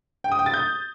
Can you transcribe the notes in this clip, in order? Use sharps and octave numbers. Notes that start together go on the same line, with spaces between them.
G5
D#6
G5
A6
G6